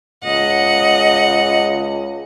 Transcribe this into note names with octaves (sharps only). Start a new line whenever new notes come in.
C#2 D#5 F#5